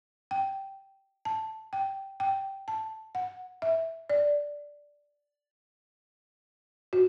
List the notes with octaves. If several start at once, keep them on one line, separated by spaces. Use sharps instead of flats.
G5
A5
G5
G5
A5
F#5
E5
D5
F#4